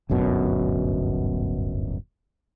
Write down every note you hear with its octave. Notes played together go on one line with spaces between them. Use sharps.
D1 G1 F#2 B2